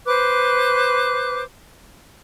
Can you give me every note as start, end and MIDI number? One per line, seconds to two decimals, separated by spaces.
0.06 1.43 71
0.06 1.43 72
0.06 1.43 86
0.06 1.43 90